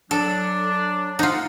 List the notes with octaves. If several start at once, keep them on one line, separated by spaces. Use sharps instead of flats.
F#3 D4 A4
D#4 F4 F#5